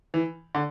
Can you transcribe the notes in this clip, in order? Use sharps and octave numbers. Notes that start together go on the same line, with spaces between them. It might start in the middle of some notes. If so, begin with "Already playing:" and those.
E3
D3